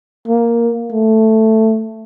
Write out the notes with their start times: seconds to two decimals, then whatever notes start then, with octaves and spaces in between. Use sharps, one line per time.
0.28 A#3
0.92 A3